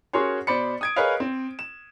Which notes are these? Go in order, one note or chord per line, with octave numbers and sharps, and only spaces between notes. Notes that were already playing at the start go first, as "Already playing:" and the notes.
C#4 F#4 G#4 A#4 C#5 C6
B2 C5 D5 B5 C#7
D#6 G#6 D7
G#4 A#4 B4 C#5 D#5 F5
C4
E7